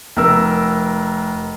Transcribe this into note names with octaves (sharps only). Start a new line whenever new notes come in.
F1 A#4 E6